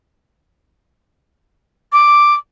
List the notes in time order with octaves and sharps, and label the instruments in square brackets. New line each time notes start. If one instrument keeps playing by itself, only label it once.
[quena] D6